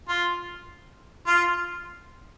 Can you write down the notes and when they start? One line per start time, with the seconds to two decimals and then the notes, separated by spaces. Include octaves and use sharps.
0.09 F4
1.27 F4